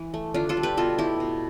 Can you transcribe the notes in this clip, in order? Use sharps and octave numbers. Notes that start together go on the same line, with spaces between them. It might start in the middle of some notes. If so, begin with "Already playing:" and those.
Already playing: E3
A3
D3 D4 F4
F4 A4
G3
G4 B4
B2 F4 A4
A3 E4 G4
B2